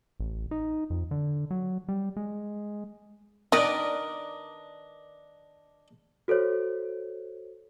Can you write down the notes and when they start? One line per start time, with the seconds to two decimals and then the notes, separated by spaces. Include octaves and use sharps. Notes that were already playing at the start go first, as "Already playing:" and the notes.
0.20 A1
0.51 D#4
0.90 F2
1.11 D3
1.51 F#3
1.89 G3
2.17 G#3
3.52 D#3 D4 A#4 B4 D5 D#5
6.28 F#4 A4 C5 C#5